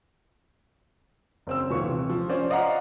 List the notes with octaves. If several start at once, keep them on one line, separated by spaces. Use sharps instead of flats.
F#1 C4 E6
D#1 A#2 E3 C#6
C3
F3
C#4 C5 D5
D5 D#5 F5 F#5 A#5